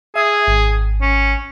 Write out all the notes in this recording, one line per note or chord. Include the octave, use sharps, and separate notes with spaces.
G#4 E5
G#1
C#4